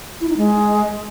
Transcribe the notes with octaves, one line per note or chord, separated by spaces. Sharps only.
E4
D#4
G#3